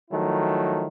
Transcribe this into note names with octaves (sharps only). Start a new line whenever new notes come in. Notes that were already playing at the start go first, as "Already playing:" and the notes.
D#3 F3 F#3 A3 E4